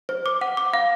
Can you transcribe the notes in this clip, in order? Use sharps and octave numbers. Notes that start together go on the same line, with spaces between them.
C5
D6
F#5
D6
F5